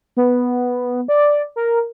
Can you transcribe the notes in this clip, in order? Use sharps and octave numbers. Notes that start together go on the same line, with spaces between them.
B3
D5
A#4